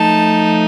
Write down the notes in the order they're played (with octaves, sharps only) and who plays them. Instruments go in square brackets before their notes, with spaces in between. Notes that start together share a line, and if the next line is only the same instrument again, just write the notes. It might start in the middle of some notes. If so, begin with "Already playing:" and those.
Already playing: [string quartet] F3 A3 D#4 A5